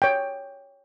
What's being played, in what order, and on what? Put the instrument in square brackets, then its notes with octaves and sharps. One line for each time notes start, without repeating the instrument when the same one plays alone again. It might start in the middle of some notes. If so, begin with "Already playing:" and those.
[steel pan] C#5 G5